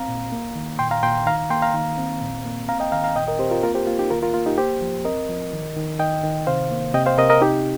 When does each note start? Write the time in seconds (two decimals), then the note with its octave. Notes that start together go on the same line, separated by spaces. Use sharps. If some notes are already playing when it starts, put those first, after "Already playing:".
Already playing: C4 F5 A#5
0.09 A#2
0.32 A#3
0.56 D#3
0.79 A#2 G5 C6
0.91 F5 A#5
1.03 A#2 G5 C6
1.26 D#3 F5 A#5
1.50 A#3 G5 C6
1.62 F5 A#5
1.74 D#3
1.98 C4
2.21 A#2
2.45 A#3
2.68 C4 F5 A#5
2.80 D#5 G5
2.92 D#3 F5 A#5
3.04 F5 A#5
3.16 A#2 D#5 G5
3.28 A#4 D#5
3.39 C4 G4 C5
3.51 F4 A#4
3.63 A#3 F4 A#4
3.75 G4 C5
3.87 A#3 F4
3.99 D#4 G4
4.10 D#3 F4 A#4
4.22 F4 A#4
4.34 A#3 F4
4.46 D#4 G4
4.58 A#3 G4 C5
4.82 F3
5.05 C4 A#4 D#5
5.29 F3
5.53 D#3
5.77 D#3
5.99 D#3 D#5 G5
6.24 D#3
6.47 C3 C5 F5
6.71 A#3
6.94 C3 D#5 G5
7.06 C5 F5
7.18 C3 A#4 D#5
7.30 A#4 D#5
7.42 C4 D#4 G4